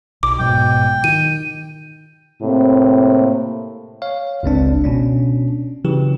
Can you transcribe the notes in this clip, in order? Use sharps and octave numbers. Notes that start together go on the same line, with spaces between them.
B1 D6
G#2 B2 F#3 G5
D#3 D#7
A2 C3 A#3 C4 E4
C#5 F5
G1 C#2 C4 D4
B2 C#4 D4
C#3 E3 F#3 G4